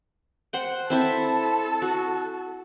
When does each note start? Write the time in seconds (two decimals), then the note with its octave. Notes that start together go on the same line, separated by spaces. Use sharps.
0.53 C5 F#5 G5
0.90 C4 E4 A4 E5
1.82 F#4